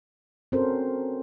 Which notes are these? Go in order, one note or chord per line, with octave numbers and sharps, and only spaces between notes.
C4 C#4 F#4 A4 A#4 C5